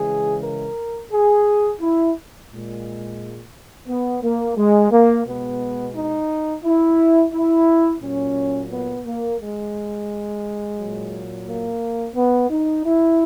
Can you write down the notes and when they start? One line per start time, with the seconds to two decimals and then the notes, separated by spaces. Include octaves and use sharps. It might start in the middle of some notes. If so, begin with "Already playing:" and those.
Already playing: C#3 E3 G#3 G#4
0.43 A#4
1.12 G#4
1.81 E4
2.49 A#2 G#3
3.88 B3
4.22 A#3
4.57 G#3
4.91 A#3
5.25 B2 G#3 B3
5.94 D#4
6.64 E4
7.32 E4
8.01 A#2 F#3 C#4
8.70 B3
9.05 A#3
9.39 G#3
10.78 A#2 F#3
11.47 A#3
12.16 B3
12.50 D#4
12.84 E4